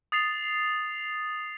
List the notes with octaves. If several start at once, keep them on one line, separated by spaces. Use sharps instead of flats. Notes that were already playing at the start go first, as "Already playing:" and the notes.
D#6 A6 C7 F7